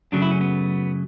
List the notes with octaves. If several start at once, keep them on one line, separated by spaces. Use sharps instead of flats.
F#2 C#3 F#3 A3 D4
E4
C#4
B3